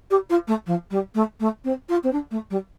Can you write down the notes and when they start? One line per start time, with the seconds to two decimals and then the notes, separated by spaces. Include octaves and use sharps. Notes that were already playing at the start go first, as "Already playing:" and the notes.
0.11 G4
0.30 F4
0.47 A3
0.66 F3
0.91 G3
1.15 A3
1.40 A3
1.64 C4
1.89 F4
2.04 C4
2.13 D4
2.31 A3
2.50 G3